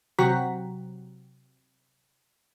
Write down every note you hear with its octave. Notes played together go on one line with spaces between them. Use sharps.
C3 F#3 F#4 A#5 B6